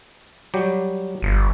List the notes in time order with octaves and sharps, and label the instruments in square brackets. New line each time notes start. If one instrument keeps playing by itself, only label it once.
[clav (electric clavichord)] F#3 G3 G4
[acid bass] G1